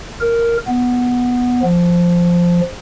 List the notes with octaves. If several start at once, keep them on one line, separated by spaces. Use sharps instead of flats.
A#4
B3
F3